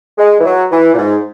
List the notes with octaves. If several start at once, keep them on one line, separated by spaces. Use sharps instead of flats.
G#3
E3
F#3
E3
A#2
G#2